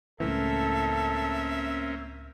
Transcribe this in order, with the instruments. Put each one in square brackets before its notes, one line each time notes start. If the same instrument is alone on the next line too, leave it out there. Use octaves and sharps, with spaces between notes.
[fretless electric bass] C#2 A2 E3 [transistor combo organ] A#3 C4 C#4 [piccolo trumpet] A4 [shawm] E5